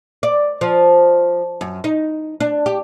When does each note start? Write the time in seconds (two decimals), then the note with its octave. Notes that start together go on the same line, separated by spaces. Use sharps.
0.23 D5
0.61 F3
1.61 F#2
1.84 D#4
2.40 D4
2.66 G4